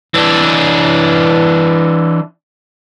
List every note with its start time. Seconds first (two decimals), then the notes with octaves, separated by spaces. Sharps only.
0.14 E3 D4